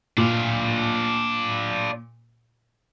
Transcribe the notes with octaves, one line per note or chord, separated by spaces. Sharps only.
A#2 D4 F5